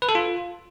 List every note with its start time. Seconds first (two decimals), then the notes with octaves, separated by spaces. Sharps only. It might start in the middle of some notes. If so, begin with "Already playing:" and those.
0.02 B4
0.09 A4
0.15 F4